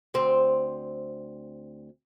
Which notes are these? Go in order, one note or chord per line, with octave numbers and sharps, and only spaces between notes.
D2 C4